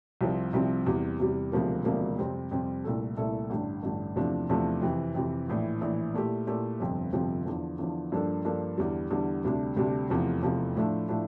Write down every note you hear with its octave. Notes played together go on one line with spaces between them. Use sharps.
C2 C3 F3 C4
C2 C3 F3 C4
E2 C3 G3
E2 C3 G3
E1 D2 C3 F3 A#3
E1 D2 C3 F3 A#3
F2 C3 G3 C4
F2 C3 G3 C4
C2 A#2 A3 E4 A4
C2 A#2 A3 E4 A4
A1 G2 D3
A1 G2 D3
E2 C3 F3 A3 D4
E2 C3 F3 A3 D4
F2 C3 E3
F2 C3 E3
A#1 A2 E3
A#1 A2 E3
A#2 A3 E4 G4
A#2 A3 E4 G4
G1 F2 C3 F3
G1 F2 C3 F3
E2 D3 F3
E2 D3 F3
G2 F3 A#3 D4 A4
G2 F3 A#3 D4 A4
E2 D3 G3
E2 D3 G3
D2 C3 G3 D4
D2 C3 G3 D4
F1 E2 C3 F3
F1 E2 C3 F3
A2 F3 A3 D4
A2 F3 A3 D4